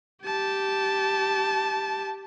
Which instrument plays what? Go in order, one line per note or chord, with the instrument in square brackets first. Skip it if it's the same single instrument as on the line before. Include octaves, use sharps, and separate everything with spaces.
[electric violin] G4 A5